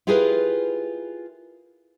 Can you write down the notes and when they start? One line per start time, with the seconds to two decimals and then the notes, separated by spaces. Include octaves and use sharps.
0.07 E4 F4 G4 G#4 A#4 B4